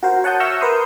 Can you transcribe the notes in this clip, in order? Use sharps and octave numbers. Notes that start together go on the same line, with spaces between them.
F#4 A#4 C5
C#5 F#5 A5 D#6 G6
E5 C#6 E6 F6 G6 A#6
A#4 B4 C6 D#6 G6